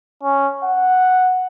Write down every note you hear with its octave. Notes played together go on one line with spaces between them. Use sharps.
C#4
F#5